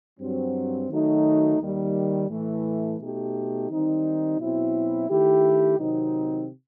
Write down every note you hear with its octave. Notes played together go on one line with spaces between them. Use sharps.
G2 F#3 C4
D#3 F#3 A3 D#4 F#4
D#2 D#3 G3
A2 E3 A3
B2 A3 D#4 G4
D#3 G3 C4 D#4
B2 F#3 C4 E4
D#3 A3 E4 G4
C3 D#3 F#3 C4 D#4